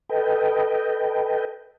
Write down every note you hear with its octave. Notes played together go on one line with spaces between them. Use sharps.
A4 B4 D#5 G5